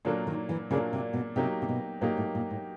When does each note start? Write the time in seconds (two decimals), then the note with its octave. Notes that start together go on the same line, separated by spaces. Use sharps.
0.05 A#2 D3 F#3 A#3 D4
0.27 D#3
0.49 E3
0.71 A#2 C#3 F#3 A#3 D4
0.93 C3
1.13 B2
1.36 C3 F#3 A#3 D#4 G4
1.62 C3
1.69 B2
2.01 A#2 F#3 A#3 D#4 G4
2.17 A2
2.35 A#2
2.50 A2